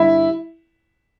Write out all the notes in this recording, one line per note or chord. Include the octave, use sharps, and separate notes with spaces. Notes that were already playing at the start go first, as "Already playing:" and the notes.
Already playing: G2 D3 G3 E4